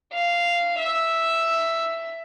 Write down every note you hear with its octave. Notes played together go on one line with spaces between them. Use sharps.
F5
E5